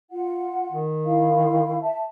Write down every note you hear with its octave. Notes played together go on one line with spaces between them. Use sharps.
F4 F#5
D#3
E4 F5
E5 A5